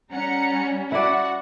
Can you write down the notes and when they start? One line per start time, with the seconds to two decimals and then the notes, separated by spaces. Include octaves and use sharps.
0.12 G3 C#4 F#5 A#5 C#7
0.92 E4 F#4 D5 F#5